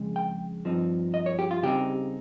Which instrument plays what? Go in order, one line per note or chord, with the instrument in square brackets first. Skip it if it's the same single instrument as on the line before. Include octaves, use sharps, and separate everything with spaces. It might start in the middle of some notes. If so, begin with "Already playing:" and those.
Already playing: [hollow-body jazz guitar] F2 C#3 G#3
G5
G2 F3 C4 D#4
D#5
C#5
G4
F4
C#3 G3 C4 D#4 G4